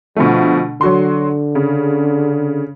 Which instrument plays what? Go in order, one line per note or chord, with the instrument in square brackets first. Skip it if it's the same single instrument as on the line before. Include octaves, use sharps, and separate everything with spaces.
[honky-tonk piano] B2 D3 A3 [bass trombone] F3
[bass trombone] D3 [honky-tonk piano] F#3 F#4 C6
[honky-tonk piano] C#3